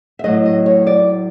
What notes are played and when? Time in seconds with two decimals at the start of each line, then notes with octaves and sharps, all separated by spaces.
0.19 E5
0.24 A2 F#3 A3 D#5
0.46 D#5
0.66 C#5
0.87 D5